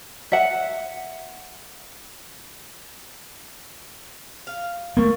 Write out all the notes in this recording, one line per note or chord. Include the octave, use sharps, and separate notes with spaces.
E5 F#5
F5
A3 A#3 A#4 C#6